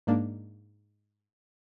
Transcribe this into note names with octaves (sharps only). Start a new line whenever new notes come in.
G#2 A#3 D4